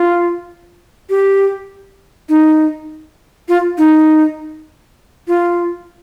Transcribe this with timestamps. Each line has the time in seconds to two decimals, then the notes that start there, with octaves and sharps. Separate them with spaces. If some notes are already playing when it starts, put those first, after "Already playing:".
Already playing: F4
1.10 G4
2.29 D#4
3.49 F4
3.78 D#4
5.28 F4